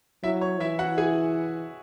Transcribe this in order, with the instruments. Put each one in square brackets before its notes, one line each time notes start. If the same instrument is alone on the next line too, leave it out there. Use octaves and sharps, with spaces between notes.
[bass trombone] F#3 [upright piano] E4 E5
[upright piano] C#5
[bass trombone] E3 [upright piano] E4 E5
[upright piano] F#4 F#5
G#4 G#5